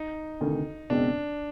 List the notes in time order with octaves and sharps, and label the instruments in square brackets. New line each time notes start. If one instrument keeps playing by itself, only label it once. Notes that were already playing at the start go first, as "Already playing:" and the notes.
Already playing: [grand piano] D#4
[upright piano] D2 C3 D#3
[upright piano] F#1 E2 B2 G#3 C4 [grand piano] D4